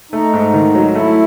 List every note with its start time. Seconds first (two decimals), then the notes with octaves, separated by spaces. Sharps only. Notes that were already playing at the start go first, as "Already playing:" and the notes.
0.12 A3 D#4
0.33 G#2
0.54 D#3
0.75 F#3
0.95 A3 E4